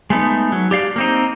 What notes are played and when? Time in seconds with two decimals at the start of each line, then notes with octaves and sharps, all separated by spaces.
0.10 G#3 A3 B3 D#4
0.52 F#3
0.71 G4 D5 F5
0.96 A#3 C4 D#4